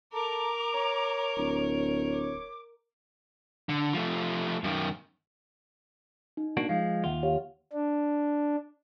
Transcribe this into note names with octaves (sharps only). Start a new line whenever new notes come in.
A4 A#4 A#5 D6
C#5
D1
D6
D3
F3 A3
F#2 D#3
D#4
A#3 D4 F#4
F3 G#3 F5
D#2 F4 E5 F#5
G4 C#5 F5
D4